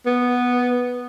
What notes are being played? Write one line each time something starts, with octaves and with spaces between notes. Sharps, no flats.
B3